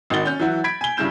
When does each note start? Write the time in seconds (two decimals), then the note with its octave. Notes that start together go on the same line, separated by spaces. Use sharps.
0.10 G#1 D#3 D#4 F#4 A6 G7
0.25 C#4 G6
0.39 E3 F#3 E4 F#4
0.64 B5 G#6 B6 D7
0.81 G#5 G7
0.97 G2 C#3 E4 G6 E7